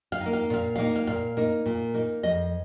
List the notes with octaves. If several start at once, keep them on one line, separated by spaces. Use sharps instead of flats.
F5
A#3 D#4
F5
A#2 F5
A#3 D#4 F5
F5
A#2 F5
A#3 D#4
A#2
A#3 D#4
F2 D#5